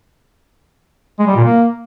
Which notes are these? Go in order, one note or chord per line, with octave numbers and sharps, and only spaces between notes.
G#3
G3
A#2
A#3